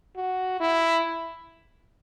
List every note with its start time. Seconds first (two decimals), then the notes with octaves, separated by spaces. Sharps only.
0.17 F#4
0.60 E4